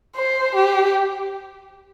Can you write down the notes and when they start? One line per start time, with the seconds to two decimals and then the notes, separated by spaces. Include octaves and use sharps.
0.16 C5
0.56 G4